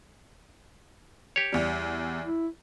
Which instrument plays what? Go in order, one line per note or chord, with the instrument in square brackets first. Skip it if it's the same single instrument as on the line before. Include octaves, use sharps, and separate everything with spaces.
[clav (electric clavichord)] G4 C#5
[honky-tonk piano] E2 G3
[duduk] E4